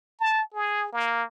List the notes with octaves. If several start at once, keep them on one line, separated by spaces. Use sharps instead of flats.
A5
G#4
A#3